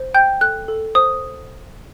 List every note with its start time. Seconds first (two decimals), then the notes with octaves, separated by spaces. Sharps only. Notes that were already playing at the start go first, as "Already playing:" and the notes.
Already playing: C5
0.14 G5 G6
0.41 A4 F#6
0.68 A4
0.95 C5 D#6